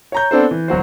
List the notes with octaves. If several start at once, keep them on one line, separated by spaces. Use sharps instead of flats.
C#5 A#5 G6
B3 C4 D4 A4 C5
E3
D1 F#3 F#4 C5